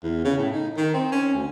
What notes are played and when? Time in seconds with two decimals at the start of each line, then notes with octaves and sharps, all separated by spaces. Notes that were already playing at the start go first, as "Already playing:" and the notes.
0.03 E2
0.24 C#3
0.38 A2
0.53 D#4
0.76 D#3
0.94 C4
1.12 C#4
1.34 D2